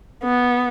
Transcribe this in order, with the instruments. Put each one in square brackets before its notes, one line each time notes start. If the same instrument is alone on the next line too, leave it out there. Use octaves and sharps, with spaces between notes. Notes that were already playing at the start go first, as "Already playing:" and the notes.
[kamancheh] B3